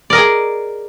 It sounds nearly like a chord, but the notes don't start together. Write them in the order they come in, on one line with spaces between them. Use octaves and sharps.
D5 A#4 D#5 G#4